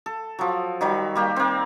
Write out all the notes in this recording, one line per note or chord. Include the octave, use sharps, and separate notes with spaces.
A4
F3 F#3
D#3 F#3 G3 B5
G3 A#3 G4
A#3 C4